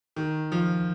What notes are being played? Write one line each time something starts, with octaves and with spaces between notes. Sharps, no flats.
D#3
F3